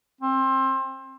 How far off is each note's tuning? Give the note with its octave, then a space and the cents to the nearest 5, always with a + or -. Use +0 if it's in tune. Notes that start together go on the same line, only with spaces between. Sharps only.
C4 +25